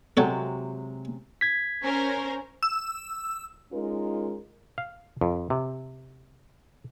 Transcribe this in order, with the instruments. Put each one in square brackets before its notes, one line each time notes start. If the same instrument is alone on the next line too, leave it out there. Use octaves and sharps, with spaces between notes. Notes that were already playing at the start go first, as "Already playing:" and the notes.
[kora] C3 F#3 G#3 [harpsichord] A4 C#5 F#5
[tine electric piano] G#6 B6
[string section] C#4 A#4 C5
[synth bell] E6
[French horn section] G#3 C#4 D#4 F4 A#4
[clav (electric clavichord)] F5
F2
C3